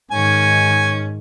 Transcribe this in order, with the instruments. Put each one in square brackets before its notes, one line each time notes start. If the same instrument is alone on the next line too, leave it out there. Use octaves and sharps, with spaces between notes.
[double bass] G#2 D#3 [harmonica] C#4 G#5